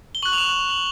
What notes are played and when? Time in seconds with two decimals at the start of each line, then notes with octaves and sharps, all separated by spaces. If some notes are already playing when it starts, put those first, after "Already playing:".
0.15 G7
0.22 C#6 F#6 F#7
0.33 F7
0.38 E7
0.70 F#7